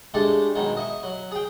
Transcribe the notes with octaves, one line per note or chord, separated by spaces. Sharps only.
G#3 A3 D4 G4 A4
B2 D#3 F#3 G#3
D#5 E5 C#6
F#3
G#4 G5